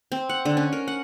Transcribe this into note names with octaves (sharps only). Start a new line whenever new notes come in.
C4
F#5
D3
C#4
A#4
F#5